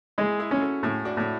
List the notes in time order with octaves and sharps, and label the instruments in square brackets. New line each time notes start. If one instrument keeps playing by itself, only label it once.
[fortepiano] G#3 [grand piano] E4 G#4
[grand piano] E4 G#4
[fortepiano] C#4
[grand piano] F#4 A4
[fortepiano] A2 [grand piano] E4 G#4
[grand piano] D4 F#4
[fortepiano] A2 [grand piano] E4